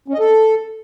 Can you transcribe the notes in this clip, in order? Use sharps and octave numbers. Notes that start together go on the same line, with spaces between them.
C#4
D#5
A4